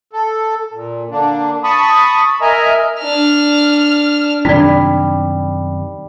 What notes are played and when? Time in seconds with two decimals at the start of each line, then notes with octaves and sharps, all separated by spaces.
0.13 A4
0.73 A#2
1.11 D3 A#3 D4
1.64 A5 B5 C#6 D#6
2.41 A#4 D#5 E5 G#5 A#5
3.00 D4 F6
4.45 F#2 C3 D#3 G3 D4 E4 D5